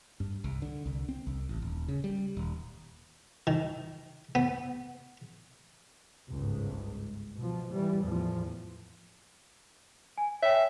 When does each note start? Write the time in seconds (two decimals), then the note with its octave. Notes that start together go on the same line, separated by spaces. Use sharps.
0.20 G2
0.44 C2
0.62 D3
0.85 C2
1.09 C4
1.27 C2
1.49 A1
1.62 D#1
1.88 C#3
2.04 G3
2.37 D#1
3.47 D#3
4.35 B3
6.28 G1 C#2 G#2
7.36 B2 F3
7.72 E3 G3
8.02 E2 A2 F3
10.18 G#5
10.42 C#5 E5 G5